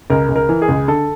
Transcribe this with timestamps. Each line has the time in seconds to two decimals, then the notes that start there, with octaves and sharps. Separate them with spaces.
0.10 C#2 A#4
0.29 C#2
0.36 A#4
0.49 E3
0.62 G#4
0.68 C#2
0.88 D3 A4